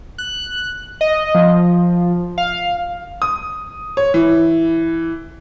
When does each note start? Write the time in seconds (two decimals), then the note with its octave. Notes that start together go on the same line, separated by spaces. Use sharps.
0.18 F#6
1.01 D#5
1.35 F3
2.38 F5
3.22 D#6
3.97 C#5
4.14 E3